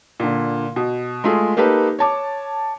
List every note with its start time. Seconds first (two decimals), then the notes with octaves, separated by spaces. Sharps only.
0.20 A#2 D3
0.76 B2
1.24 G#3 A3 F4 G#4
1.57 A#3 D#4 G4 A4 B4
1.99 C#5 A5 D6